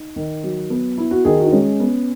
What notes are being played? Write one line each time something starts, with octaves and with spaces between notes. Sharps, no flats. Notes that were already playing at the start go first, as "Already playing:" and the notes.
Already playing: D#4
D#3
F#3
B3
E4
F#4
D#3 G#4
F#4
D#4
G#3 C#4
B3